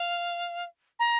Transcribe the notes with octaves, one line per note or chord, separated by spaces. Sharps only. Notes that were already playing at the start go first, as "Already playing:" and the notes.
Already playing: F5
A#5